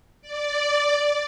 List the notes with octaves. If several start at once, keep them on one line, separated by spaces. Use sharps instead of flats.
D5